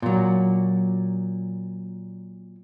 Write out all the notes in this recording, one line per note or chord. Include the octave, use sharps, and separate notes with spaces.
A#2 F#3